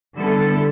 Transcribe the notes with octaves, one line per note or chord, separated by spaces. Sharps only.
D3 G3 B3 E4 A4